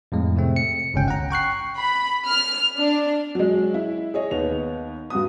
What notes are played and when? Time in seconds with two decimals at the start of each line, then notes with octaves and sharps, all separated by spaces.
0.12 F2 A2 G#3
0.36 C3 A3 C4
0.56 C#7
0.94 G1 C#2 C#4 G5
1.08 F#5 A#5
1.31 G5 C#6 F#6 C7
1.79 B5
2.27 F6
2.78 D4
3.35 F#3 G#3
3.74 E4
4.14 G#4 C#5 D#5
4.31 D#2 B3 F7
5.10 G2 F#4 D#6